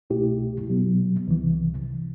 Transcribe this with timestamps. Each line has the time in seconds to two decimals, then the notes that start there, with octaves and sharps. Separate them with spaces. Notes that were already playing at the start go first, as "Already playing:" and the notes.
0.10 C2 B2 A3 E4 G4
0.68 B2 F#3 B3
1.27 C2 C3 E3